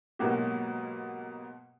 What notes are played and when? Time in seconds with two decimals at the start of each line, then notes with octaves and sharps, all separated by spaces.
0.19 G#2 B2 F#3 A#3 F#4 G4